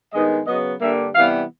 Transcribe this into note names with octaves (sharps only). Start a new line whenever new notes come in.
G2 D#3 G#3 B3 D#4 D#5
C#3 F#3 B3 D#5
G2 D3 G3 A#3 D4 E5
C3 E3 G3 B3 F5